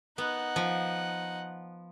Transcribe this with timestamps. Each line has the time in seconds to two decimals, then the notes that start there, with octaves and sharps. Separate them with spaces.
0.18 B3 D#4 F#5
0.56 F3